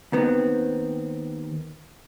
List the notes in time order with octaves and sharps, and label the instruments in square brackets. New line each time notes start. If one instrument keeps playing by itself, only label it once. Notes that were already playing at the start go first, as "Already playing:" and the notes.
[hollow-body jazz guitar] D#2 D#3 B3 C4